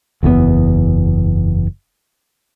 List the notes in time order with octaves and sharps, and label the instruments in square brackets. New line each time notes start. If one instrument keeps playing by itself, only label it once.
[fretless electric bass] F#1 E2 C3 B3